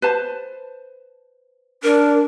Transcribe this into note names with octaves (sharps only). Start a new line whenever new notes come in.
B4 C5 A5
D4 A#4